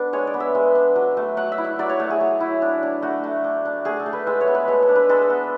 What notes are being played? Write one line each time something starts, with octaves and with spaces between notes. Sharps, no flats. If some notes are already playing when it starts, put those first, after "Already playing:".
Already playing: B3 D4
G#3 C#5
D5
B3
E5
G#3
D4
F#3
A3
F#3 F#5
E5
E4
E5
F#3 D5
C#5
A3
G#4
F#3
E4
D4
D4
A3 F#4
A3
D4
D4
A3 G#4
A4
A3
B4
G#3 E5
C#5
B3
B4
G#3 A4
A4
D4
B4
G#3 A4
B3